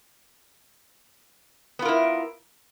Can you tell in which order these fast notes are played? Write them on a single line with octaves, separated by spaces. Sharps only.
B3 F4 A#4 E4